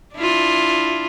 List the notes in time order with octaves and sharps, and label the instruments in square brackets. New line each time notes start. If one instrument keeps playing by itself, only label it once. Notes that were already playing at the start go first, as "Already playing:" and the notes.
[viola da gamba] D4 E4 F4